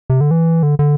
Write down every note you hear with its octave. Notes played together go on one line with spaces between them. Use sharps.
C3
D3
E3
D3
D3